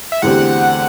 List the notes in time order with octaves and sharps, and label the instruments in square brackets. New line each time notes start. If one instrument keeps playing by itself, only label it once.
[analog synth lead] E5
[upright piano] E2 D3 A3 C4 G4 [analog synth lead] F#5